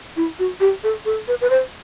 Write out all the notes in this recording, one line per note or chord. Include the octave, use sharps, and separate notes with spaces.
E4
F#4
G4
A4
A4
B4
B4
C5